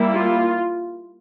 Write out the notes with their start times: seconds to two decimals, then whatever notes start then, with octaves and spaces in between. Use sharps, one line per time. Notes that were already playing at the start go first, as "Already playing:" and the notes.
Already playing: G3 A#3 E4
0.14 F4